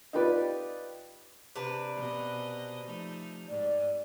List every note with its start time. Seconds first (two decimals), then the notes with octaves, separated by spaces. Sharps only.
0.13 D#4 F4 G4 B4 D5
1.56 C3 D4 B4
1.96 B2 D#5
2.84 F3 A3 D#4
3.48 G#2 D5